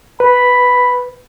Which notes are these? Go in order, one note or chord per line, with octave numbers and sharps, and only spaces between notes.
B4 B5